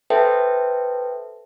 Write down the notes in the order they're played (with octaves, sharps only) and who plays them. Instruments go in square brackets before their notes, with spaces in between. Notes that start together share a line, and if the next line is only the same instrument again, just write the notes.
[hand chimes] A4 B4 C5 E5 G5 A5